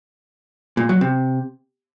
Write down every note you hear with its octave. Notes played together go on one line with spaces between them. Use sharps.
A#2
F#3
C3